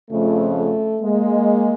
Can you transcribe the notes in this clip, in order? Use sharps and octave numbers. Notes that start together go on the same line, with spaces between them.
F2 C#3 F3 A3
A3
G#3 A#3